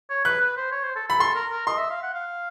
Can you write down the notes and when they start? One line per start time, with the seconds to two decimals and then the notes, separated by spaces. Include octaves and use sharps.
0.10 C#5
0.25 B4 F#6
0.41 B4
0.57 C5
0.72 C#5
0.84 C5
0.96 A4
1.08 A4 B5
1.19 A4 C6
1.35 A#4
1.52 A#4
1.67 D#5 C6
1.78 E5
1.91 F5
2.03 F#5
2.14 F5